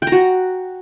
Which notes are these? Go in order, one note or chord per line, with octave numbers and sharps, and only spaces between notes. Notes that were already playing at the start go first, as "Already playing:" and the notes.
F#4 G5 A#5